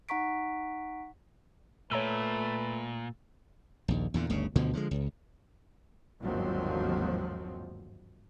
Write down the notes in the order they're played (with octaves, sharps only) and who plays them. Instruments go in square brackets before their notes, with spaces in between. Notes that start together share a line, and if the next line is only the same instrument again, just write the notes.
[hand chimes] D#4 F#5 A#5 C#6 B6 D7
[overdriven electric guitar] A#2 [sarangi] A3 [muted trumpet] B4 [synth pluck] C#5 A#5 E6
[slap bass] A#1 D#2
E2 A#2 D3
G1 D2 C#3
D2 B2 D3 F3
D3 F3 F#3 G#3
C#2
[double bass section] G1 D#2 G#2 F3 F#3 C4